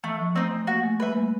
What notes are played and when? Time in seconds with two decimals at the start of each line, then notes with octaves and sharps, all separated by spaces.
0.04 E3 A3
0.19 F3
0.35 A3 C4 D#4
0.51 A3
0.67 A#3 F#4
0.84 A3
1.00 G3 B4 E5
1.12 A#3
1.15 A3